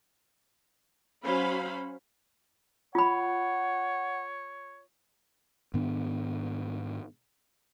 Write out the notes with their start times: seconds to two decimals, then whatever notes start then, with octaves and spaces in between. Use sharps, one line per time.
1.24 F#3 C#4 C5 F5 B5
2.95 F4 C#5 F#5 B5
5.74 G#2 D#3 B3 D4